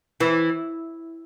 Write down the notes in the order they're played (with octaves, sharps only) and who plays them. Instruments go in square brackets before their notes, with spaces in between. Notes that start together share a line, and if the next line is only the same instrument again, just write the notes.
[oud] E3